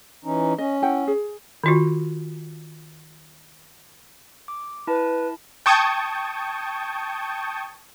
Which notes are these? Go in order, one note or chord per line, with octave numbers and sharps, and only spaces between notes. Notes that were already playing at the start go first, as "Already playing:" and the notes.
E3 C#4 D#4
C#4 D#5
E4 F#5 G5
G#4
D#3 F4 F#4
D6
E4 B4 A5
G5 A5 C#6 D#6 G6 G#6